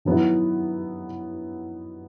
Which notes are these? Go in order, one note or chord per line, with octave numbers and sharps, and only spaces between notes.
D#3 F#3 B3 E4